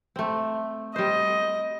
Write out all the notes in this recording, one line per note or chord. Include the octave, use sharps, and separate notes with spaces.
A3 C4
G3 C5 D#5